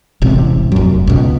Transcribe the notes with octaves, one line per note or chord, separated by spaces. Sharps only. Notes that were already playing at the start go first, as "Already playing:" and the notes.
E1 A1 C3
F1 F#2
C#2 B2